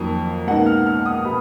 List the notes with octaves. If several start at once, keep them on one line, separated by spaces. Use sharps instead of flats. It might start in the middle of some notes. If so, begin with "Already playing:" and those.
Already playing: F2 D#3 F#3 A#3
C#2 B2 A#3 D#4 F#5
F6
F6
D#6
B2 B5